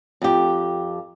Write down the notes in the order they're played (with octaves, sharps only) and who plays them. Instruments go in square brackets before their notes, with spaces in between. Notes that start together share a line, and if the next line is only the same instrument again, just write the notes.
[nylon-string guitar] F2 G4